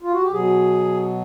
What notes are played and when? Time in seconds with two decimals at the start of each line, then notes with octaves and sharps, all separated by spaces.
0.03 F4
0.13 F#4
0.23 G4
0.32 B2 F#3 G#4